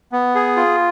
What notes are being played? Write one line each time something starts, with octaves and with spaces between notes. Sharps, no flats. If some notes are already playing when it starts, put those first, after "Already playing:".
B3
G#4
F4